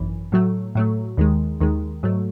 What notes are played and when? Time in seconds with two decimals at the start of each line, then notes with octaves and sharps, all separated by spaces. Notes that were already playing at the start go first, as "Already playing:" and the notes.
Already playing: G#1 F#2 E3
0.32 A2 F#3 A3
0.75 A2 F#3 A3
1.17 D#2 D#3 G#3
1.61 D#2 D#3 G#3
2.03 G#2 F#3 A3